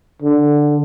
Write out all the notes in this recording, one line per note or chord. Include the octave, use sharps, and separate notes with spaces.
D3